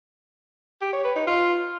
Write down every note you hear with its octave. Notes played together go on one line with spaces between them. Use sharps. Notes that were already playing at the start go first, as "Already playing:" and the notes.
G4
C#5
B4
D#4
F4